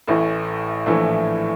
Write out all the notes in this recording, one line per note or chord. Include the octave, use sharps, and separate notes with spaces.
A1 A2 E3
A#1 A2 E3 A3 E4